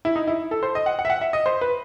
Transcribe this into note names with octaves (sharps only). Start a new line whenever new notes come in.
E4
D#4
E4
A4
C5
D#5
F#5
F#5
E5
F#5
E5
D#5
C5
B4